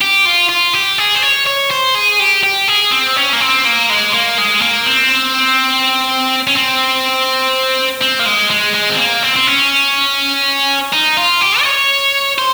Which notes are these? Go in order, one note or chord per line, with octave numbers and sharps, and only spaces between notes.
G4
F4
F4
G4
G#4
C5
C#5
C#5
C5
G#4
G4
G4
G#4
C4
C#4
A#3
C4
A#3
G#3
A#3
G#3
A#3
C4
C#4
C4
C4
A#3
G#3
G#3
G#3
C4
A#3
C4
C4
C#4
D#4
F4
G4
D#5
C#5
C5